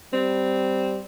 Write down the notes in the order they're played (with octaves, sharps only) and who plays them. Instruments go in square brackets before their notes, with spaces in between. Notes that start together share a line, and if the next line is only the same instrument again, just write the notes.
[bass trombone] G3 [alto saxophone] C4